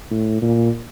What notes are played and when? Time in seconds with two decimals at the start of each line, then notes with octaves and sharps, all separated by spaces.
0.11 A2
0.42 A#2